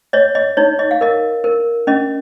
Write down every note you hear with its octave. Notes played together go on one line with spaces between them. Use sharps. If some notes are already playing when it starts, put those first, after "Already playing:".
C#5 D#5
D#5
D#4 C#5
D#5
F5
A#4 D#5
A#4
C#4 D#5